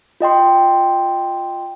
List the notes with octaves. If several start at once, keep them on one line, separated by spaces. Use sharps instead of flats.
F4 D#5 G5 C6